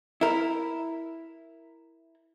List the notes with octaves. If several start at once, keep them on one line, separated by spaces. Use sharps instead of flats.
E4 A#4